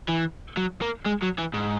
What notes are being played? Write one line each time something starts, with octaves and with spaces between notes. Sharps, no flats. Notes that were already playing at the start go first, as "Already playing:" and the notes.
E3
F#3
A#3
G#3
F#3
E3
G#2